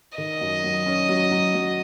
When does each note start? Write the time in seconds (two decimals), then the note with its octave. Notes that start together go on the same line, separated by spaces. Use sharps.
0.18 D#3 D#5
0.41 F#2
0.64 F#3
0.86 C#4
1.09 F#3
1.31 F#3
1.54 F#3